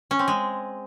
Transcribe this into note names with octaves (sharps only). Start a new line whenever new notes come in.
C#4
C4
G#3